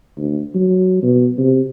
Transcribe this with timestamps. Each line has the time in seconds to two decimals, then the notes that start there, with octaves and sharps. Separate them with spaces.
0.17 D2
0.54 F#3
1.03 B2
1.38 C3